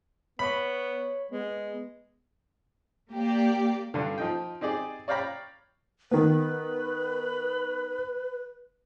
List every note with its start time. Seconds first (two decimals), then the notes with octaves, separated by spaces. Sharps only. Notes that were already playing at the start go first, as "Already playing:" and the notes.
0.39 B3 C#5 B5
1.31 G#3 B3
3.13 A#3 G4 D5
3.94 G2 D3
4.18 F3 D#4 G5
4.61 C4 D#4 G4 G#4 D5
5.08 C#5 D5 F5 G5 A#5 B5
6.11 D#3 B3 B4